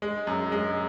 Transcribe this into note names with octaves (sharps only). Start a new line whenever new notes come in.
G#3
F#2
G#3